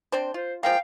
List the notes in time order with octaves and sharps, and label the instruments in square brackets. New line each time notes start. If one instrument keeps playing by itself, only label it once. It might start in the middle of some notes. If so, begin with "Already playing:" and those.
[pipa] C4 D4 C5
[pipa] F4 [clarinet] C5
[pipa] F3 G#3 A#3 [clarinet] F5 [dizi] G5